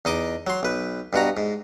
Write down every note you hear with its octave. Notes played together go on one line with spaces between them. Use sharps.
E2 D#4 D#5 D6
F#3 C6
B1 B4
G2 B2 F#4 A#5
G#2